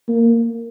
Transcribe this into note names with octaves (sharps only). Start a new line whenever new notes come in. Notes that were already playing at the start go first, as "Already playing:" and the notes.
A#3